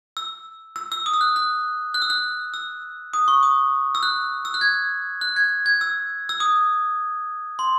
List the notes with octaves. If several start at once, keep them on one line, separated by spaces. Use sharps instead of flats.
E6
E6
E6
D#6
E6
F#6
F#6
F#6
E6
F#6
E6
D#6
C#6
D#6
E6
F#6
E6
F#6
G#6
F#6
G#6
G#6
E6
E6
D#6
C6